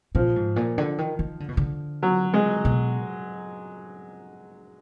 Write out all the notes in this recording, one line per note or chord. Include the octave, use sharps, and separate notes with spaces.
A#2 F3
G#2
A#2
D3
D#3
D#3
D3
B2
D3
F#3
G#3
B2